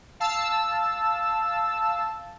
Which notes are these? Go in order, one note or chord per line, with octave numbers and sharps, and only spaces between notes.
F5 A5 E6